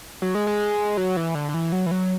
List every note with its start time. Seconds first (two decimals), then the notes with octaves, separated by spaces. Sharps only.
0.22 F#3
0.35 G#3
0.47 G#3
0.97 F#3
1.16 E3
1.35 D3
1.49 D3
1.54 E3
1.72 F#3
1.86 E3
1.91 F#3